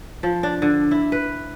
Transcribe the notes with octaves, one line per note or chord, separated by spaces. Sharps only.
F3
D4
D3
E4
B4